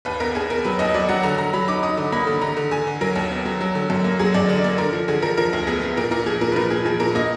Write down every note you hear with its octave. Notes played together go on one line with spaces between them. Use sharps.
D#2 B4
B3 A#4
D#2 G#4
B3 A#4
F#3 B4
D#2 D#5
F#3 D5
F#3 F#5
D3 A#5
D3 A#5
F#3 B5
D#4 D6
D#4 D#6
D3
A#3 B5
D3
D3 A#5
D3
D3 G#5
D3
F#3 A#4
D#2
B3
F#3
F#3
D3
F#2
A#3
F#3 G#4
F#2 D5
D3 D5
A#3 D5
D3 A#4
F3
D3 G#4
F3 A#4
F3 A#4
D2
B3 G#4
B3
A#2 A#4
A#2 A#4
F3 G#4
A#2 A#4
B4
F3 A#4
A#2 G#4
F3 G#4
A#2 A#4
A#3 D#5